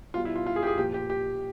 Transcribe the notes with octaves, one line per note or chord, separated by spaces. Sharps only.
B2 G3 F4
E4
F4
F4
G#4
G4
G#4
A#2 F3 G4
G4
G4